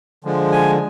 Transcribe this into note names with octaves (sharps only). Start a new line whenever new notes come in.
D3 F3 G#3
G#5